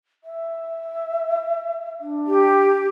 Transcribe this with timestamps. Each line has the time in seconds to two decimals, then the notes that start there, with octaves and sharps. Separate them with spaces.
0.24 E5
2.01 D4
2.25 G4